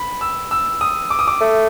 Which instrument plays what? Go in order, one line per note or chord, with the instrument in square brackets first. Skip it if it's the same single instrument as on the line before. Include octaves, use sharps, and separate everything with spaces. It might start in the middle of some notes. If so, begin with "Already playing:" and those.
Already playing: [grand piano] B5
E6
E6
D#6
D6
D#6
D6
[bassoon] A3